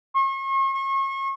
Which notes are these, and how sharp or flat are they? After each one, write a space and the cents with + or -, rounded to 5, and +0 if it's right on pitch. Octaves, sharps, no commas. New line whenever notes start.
C#6 -40
C#6 -35